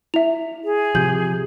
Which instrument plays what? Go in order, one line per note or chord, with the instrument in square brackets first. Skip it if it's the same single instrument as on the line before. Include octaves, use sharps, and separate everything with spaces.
[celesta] E4 [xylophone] E5 F7
[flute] G#4
[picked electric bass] C3 F3 [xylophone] G4 G6 F#7